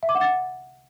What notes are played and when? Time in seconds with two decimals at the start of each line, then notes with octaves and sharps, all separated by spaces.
0.03 E5
0.09 D6
0.15 F#5
0.21 A6